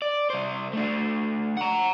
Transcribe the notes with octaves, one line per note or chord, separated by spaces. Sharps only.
D5
C2 C5
A3 D4
F#5 A#5